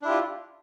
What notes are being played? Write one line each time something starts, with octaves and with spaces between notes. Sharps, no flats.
D4 E4 F4 G4